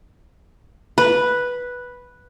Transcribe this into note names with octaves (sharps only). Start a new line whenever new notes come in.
B4